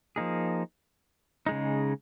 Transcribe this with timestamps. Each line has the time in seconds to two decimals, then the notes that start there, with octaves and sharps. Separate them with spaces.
0.16 F3 A#3 D#4 G#4
1.46 C#3 G#3 D#4